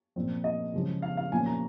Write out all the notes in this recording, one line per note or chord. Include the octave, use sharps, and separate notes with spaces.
A#2 F3 C4
D#5
C#3 F3 G#3
F5
F5
A#2 F3 A#3 C#4 F4 G#5
A#5